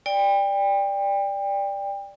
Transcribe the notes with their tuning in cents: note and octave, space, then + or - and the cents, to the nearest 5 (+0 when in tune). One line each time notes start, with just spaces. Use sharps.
D5 +0 G5 +25